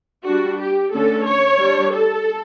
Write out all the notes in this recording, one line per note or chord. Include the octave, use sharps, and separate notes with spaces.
G3 D4 F#4
G4
D3 A3 C#4 A4
C#5
G3 D4
A4